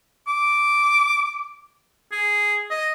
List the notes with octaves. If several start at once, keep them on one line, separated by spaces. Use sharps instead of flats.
D6
G#4
D#5